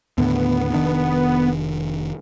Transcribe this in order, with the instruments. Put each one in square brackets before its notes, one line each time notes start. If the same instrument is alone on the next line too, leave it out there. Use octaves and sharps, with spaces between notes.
[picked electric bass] D#2 A2 D3 [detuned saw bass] B3
[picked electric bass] F1 D#3 D4